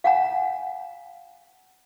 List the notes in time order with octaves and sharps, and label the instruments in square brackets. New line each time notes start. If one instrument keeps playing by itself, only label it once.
[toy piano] F5 F#5 G#5 A#5